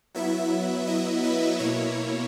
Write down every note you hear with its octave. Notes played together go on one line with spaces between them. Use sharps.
F#3 B3 E4 E5
D#5
B4
B2 A#3 E4 C#5